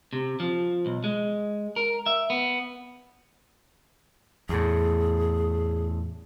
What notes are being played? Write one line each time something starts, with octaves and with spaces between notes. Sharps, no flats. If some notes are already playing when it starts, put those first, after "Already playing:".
C3
F3
B1
G#3
A#4
E5
B3
E2 A2 G#4